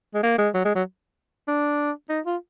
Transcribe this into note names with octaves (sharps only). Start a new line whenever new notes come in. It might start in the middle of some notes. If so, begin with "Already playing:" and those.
G#3
A#3
G#3
F#3
G#3
F#3
D4
D#4
F4